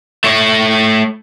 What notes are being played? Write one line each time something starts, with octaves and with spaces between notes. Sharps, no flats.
A3 C#5